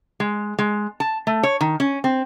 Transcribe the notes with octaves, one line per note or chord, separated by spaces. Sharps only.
G#3
G#3
A5
A3
C#5
D#3
C#4
C4